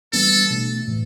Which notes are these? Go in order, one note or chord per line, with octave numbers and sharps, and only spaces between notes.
E3 G3 B3 D4 A4
B2 A3 D4
A2 E3